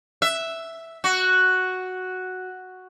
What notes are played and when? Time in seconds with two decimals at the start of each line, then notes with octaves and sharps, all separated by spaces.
0.22 E5
1.04 F#4